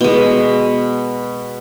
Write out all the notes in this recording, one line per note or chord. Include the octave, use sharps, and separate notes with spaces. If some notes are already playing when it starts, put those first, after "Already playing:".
B2 G#3